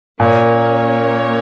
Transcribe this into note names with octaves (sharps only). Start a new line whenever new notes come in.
A#2 A#3 C#4 A#4 C#5